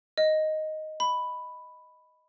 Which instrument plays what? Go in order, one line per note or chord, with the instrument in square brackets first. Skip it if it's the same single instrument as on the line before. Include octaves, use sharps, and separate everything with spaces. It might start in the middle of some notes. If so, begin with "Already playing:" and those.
[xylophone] D#5
B5